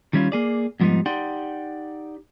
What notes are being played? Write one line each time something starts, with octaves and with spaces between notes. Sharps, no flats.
D#3 G3 C#4 E4 F4
A#3 G#4 D5
F2 G#2 F3 G3 B3 D#4
D#4 G4 D5 F#5 G5 C6